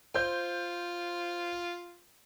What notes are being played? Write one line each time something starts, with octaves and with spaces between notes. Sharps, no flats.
F4 C5 G6